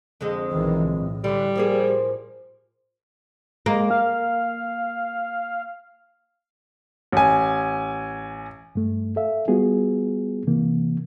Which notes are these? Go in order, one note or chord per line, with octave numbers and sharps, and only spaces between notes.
F2 D3 G#3
B1 D#3 E3
A2
D3 E3 G3
F3 A#3 G#4
G#3 A#3
F5
A1 G#5
G2 A3
A4 E5 F5
G3 B3 F4 F#4 G#4
C3 E3 A#3